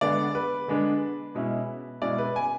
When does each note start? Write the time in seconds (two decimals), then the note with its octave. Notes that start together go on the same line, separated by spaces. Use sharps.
0.01 D3 G#3 B3 D4 D5
0.35 B4
0.68 D3 G#3 B3 D4
1.35 B2 G#3 C#4 E4
2.02 B2 G#3 C#4 E4 D5
2.18 B4
2.36 G#5